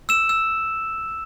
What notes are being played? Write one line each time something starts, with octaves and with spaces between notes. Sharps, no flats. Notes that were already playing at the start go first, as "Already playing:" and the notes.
E6 E7
E6